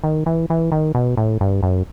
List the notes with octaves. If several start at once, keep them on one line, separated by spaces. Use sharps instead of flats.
D#3
E3
E3
D#3
B2
A2
G2
F#2